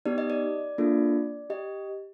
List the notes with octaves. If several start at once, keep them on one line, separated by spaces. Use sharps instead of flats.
B3 D#4 G4 D5
D#5
D5
A#3 D4 F4 A4
G4 D#5